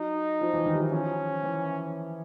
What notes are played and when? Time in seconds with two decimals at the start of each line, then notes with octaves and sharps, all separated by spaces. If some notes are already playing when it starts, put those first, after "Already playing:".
Already playing: F#3 D#4
0.41 F3
0.53 E3
0.66 D#3
0.73 G3
0.79 F#3
0.92 F3 C#4
1.43 E3